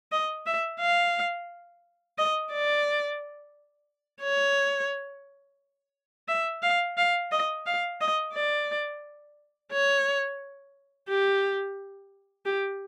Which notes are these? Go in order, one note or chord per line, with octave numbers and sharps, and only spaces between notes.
D#5
E5
F5
D#5
D5
C#5
E5
F5
F5
D#5
F5
D#5
D5
C#5
G4
G4